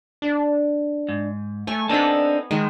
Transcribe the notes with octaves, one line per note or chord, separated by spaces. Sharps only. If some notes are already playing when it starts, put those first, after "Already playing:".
D4
G#2
A3 C#5 G#5
B3 C4 D4 D#4 A4 C#5 B5
D#3 G#3